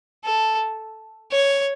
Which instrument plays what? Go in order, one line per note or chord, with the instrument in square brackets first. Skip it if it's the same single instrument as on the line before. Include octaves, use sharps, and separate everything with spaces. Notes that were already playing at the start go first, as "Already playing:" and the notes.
[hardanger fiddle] A4
C#5